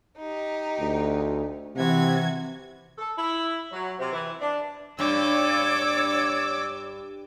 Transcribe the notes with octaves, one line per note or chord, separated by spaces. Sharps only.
D#4 G4
D2
C3 E3 F#4 G#6
A4
E4
F#3
C3
E3
D4
G2 C#5 D5 D6 E6